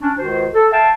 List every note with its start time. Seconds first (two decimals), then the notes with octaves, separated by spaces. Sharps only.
0.01 C#4 D4
0.18 C#2 D#3 F#4 C5
0.54 A4
0.72 E5 F5 G5 A5